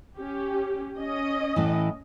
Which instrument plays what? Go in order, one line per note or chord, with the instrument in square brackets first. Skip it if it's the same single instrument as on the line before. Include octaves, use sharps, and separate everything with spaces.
[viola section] C#4 G4
C#4 D#5
[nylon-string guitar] A2 E3